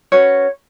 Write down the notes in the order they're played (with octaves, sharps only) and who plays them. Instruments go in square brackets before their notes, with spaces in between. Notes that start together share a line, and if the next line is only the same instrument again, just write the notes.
[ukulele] C#4 F#4 B4 C#5